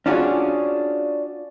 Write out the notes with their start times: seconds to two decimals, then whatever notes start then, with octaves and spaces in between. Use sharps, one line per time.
0.06 C#4 D4 F4 F#4 G#4